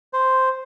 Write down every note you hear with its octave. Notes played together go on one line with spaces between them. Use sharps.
C5